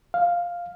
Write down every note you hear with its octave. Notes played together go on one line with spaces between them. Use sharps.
F5